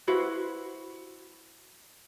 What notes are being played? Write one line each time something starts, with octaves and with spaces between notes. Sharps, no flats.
E4 F#4 B4 C5